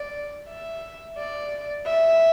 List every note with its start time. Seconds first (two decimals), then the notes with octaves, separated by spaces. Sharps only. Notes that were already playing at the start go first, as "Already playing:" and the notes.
Already playing: D5
0.49 E5
1.17 D5
1.86 E5